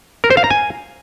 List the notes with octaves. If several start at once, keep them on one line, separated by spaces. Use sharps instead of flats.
A#4
C5
F5
A#5
G#5